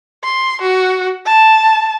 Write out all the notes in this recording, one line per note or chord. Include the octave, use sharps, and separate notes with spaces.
C6
F#4
A5